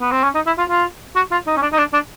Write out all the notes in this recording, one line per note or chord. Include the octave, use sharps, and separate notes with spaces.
B3
C4
C#4
D#4
E4
F4
F4
F#4
F4
D#4
C#4
D4
D#4
D4
D4